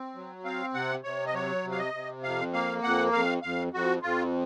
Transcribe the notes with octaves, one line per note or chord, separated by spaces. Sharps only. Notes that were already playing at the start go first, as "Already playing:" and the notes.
Already playing: C4
F#3
C4 F5
C3 F#5
C3 C#5
D#5
F#3 C#5
C3
F5
D#5
C3
F2 F5
A#3 F5
F2 F#5
F2 F5
F2 F5
F2 F#4
F2 F4